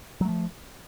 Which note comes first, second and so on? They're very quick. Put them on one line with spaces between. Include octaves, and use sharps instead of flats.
F#3 A3 F3